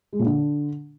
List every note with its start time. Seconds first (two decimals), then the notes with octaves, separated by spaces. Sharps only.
0.13 G#3
0.19 A#2
0.26 D3